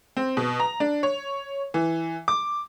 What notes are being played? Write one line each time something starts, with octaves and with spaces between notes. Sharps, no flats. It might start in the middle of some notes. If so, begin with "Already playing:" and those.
C4
B2
A#5
D4
C#5
E3
D6